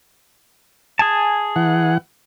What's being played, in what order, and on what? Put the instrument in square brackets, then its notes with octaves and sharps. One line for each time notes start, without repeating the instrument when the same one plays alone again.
[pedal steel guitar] G#4 G#5 A5
[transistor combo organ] E3 F#5